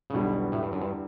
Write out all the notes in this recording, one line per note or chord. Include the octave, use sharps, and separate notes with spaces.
C#3
B1 E2 B2 D3 G3
A2
G2
F#2
G2